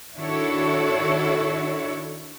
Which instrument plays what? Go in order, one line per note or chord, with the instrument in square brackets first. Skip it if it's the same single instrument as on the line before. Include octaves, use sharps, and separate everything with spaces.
[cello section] D#3 D4 E4 F#4 A4 C#5